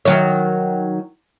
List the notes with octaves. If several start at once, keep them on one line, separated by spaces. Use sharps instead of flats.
D#3 F#3 C#5